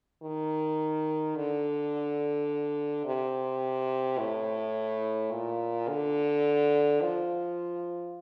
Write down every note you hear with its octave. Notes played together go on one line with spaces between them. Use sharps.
D#3
D3
C3
A2
A#2
D3
F3